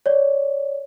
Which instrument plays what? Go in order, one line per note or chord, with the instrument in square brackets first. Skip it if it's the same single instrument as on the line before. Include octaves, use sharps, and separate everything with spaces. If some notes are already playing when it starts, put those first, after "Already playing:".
[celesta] C#5 D5